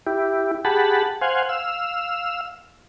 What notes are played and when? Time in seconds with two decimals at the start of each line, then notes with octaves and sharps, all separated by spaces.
0.06 E4 G4
0.65 G4 G#4 F#5 A5 B5
1.21 C5 F5 F#5 G#5
1.49 F5 E6